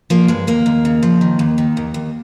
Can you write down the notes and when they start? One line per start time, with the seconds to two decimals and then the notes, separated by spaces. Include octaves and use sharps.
0.10 F3 A#3
0.28 G2 G#3
0.47 D#2 A#3
0.66 D#2
0.85 C#3
1.03 F3
1.21 D#3
1.39 D#2
1.58 D#3
1.77 D#2
1.94 D#2